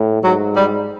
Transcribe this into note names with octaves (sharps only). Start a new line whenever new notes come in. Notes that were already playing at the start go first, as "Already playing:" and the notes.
Already playing: A2
G#2 F#3
G3